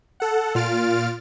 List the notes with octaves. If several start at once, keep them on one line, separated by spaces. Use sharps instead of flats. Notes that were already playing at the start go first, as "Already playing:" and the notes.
A4 F#5
A#2 F4 F6 A6 D7